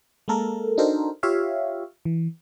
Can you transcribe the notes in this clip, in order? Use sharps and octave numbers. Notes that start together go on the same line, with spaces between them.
G#3 A#3 A4 A#4
D4 D#4 F#4 A4 A#4 C5
F4 G4 C#5 E5 F5
E3